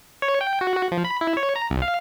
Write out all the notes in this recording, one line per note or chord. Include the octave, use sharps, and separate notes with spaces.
C#5
G5
F#4
F#4
F3
B5
E4
C#5
A#5
C2
F5